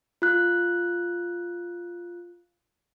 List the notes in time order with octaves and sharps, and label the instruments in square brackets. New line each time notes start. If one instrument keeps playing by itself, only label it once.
[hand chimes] F4 F#6